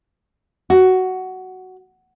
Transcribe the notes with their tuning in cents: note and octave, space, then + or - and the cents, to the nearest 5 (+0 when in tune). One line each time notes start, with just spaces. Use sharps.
F#4 +10